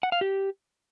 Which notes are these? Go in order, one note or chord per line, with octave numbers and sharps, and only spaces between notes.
F#5
F5
G4